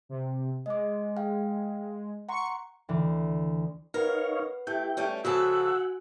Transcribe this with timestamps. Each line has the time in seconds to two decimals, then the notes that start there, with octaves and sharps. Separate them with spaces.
0.09 C3
0.66 G#3 D#5 D6
1.16 G#4 F5 G5
2.29 F#5 A#5 C6 C#6 C#7
2.89 D2 E3
3.94 D#4 A#4 B4 C#5 F5 F#5
4.67 A3 E4 G4 G5
4.97 G3 A3 C#4
5.25 C#3 F3 F#4 A4 F#5 G#5 E6